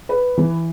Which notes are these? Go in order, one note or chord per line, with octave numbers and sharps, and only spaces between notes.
B4
E3